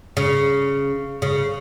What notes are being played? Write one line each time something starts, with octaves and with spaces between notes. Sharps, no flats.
C#3
C#3